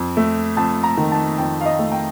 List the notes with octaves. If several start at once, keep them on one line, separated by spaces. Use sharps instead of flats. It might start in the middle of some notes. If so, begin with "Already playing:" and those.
Already playing: F2
A3
F2 A5
A#5
D#3
A5
F2 G5
F5
D#5
A3
G5